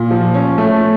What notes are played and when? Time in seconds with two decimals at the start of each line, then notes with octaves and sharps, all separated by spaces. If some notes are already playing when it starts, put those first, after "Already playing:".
Already playing: A#2
0.11 F3
0.34 C#4
0.58 A3